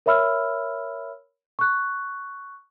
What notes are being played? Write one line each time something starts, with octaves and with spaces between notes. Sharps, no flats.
A#4 C#5 E5 B5 E6 F6
C#6 F#6